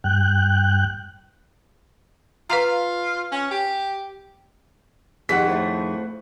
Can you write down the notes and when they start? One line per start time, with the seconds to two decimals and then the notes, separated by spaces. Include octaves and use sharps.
0.04 G2 G5 F#6
2.50 F4 B4 F5 A#5
3.32 C#4
3.51 G4
5.29 F2 D#3 G4 G#4 F#5 B6
5.48 A2 A3 C5